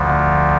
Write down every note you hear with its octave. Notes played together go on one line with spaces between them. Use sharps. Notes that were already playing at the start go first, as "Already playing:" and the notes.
Already playing: D2 D3 F3